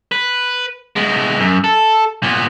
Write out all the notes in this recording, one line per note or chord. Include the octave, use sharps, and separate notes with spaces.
B4
G#3 B3
F#2
A4
A#2 B3